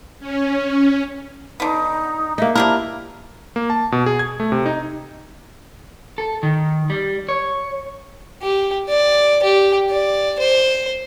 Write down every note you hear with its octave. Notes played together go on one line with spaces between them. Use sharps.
C#4
D3 B3 D#4
A#3 D#4 E5
F3 D4 E4 G4 A#4
A#3
A5
B2
G#4
G#6
A3
C3
D#4
A4
D#3
G3
C#5
G4
D5
G4
D5
C5